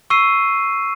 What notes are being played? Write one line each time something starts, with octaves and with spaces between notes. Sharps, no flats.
C#6 E6 C7 D#7